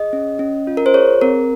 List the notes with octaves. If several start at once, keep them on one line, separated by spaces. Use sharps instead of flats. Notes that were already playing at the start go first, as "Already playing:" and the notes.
Already playing: G#4 D#5
C#4
C#4
F4
A#4
C5
G#4 C#5
C4 A#4